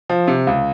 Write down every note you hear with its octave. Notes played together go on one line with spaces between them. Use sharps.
F3
C3
C#2